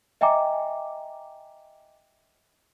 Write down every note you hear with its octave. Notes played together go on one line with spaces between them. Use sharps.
D#5 E5 G5 G#5 A#5 D6